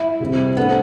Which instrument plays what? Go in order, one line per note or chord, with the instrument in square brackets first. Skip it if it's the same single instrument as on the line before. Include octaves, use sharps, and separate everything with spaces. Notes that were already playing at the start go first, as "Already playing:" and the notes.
Already playing: [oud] E4
[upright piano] C3 G3 C4
[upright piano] A3 D4 A4 C5 [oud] B3